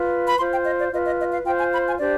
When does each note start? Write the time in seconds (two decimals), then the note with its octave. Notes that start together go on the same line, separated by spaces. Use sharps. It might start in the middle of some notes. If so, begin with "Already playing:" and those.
Already playing: F4 B4
0.28 B5
0.38 F4 C5 C6
0.53 G5
0.65 D#5
0.79 D5
0.92 F4 B4 D#5
1.05 D#5
1.20 D#5
1.33 F5
1.45 F4 C5 G5
1.59 G#5
1.73 B5
1.86 G#5
1.99 D4 G4 C5 D5